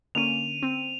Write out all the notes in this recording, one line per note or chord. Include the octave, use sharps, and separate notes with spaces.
D3 A#3 C#4 D#7 F7
C4